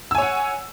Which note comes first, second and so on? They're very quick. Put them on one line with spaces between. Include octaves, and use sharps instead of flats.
E6 G#5 C#5 F#5